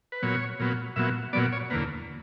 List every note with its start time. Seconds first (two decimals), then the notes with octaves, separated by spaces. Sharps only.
0.12 B4
0.22 A#2 F#3 B3 C#5
0.60 A#2 F#3 B3
0.96 A#2 F#3 B3 E5
1.33 A#2 F#3 B3 D5
1.52 C#5
1.70 E2 D3 A#3 B4